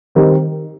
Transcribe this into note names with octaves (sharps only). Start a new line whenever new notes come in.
D#3 G3 C4 G4 A#4